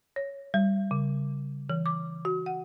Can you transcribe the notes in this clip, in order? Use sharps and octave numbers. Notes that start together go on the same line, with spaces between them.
C#5
G3
C#3
E3
D6
F#4
F#5